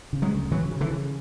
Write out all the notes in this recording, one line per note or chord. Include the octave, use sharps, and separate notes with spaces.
C#3
F#3 G#3
D2
C#3 E3 F#3
C#3
D3 E3
C#3